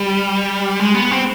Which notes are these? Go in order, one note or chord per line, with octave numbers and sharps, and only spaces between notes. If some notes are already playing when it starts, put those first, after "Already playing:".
Already playing: G3
G#3
B3
C4